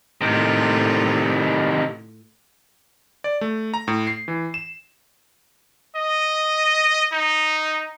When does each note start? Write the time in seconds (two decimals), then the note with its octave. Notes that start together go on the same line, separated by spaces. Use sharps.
0.21 A2 C3 D#3 F4 A4
3.24 D5
3.41 A3
3.74 A#5
3.88 A2
4.07 C7
4.28 E3
4.54 E7
5.96 D#5
7.12 D#4